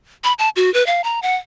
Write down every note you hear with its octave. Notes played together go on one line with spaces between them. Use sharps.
B5
A5
F#4
B4
F5
A#5
F#5